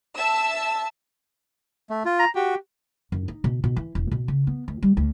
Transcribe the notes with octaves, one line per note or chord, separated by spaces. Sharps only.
E5 A5 E6
A3
F4
A#5
F#4 G4
F#2
D#4
B2
B2
E3
E1
B2
C#3
B3
D2
G3
D2